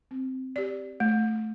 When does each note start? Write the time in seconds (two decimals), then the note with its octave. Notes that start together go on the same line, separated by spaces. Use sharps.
0.11 C4
0.56 G4 D5
1.00 A3